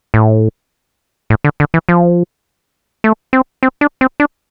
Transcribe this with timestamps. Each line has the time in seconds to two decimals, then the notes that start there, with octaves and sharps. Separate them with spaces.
0.14 A2
1.30 A2
1.44 D3
1.60 D3
1.74 E3
1.89 F3
3.04 A3
3.33 C4
3.63 C4
3.81 D4
4.01 C4
4.20 D4